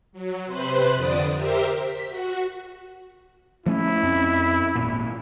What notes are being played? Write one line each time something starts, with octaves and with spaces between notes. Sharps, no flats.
F#3
C3 B4 C5 C6 F#6
F2 D3 D4 D5 D#6
G4 A#4 C5 E5
B6
F#4
F3 A3 C#4 E4
F2 C4 C#4
G#1 A#2